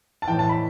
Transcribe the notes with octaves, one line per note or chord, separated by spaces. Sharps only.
A5
A2 E3 G5
A5
B5